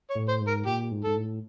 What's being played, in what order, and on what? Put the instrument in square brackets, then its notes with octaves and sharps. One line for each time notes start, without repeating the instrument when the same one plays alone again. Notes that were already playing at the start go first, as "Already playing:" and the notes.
[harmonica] C#5
[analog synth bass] A2
[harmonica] C5
[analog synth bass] G#2
[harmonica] A#4
[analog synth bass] A#2 [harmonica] G4
[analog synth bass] G#2
[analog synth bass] G#2 [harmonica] A4
[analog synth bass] A2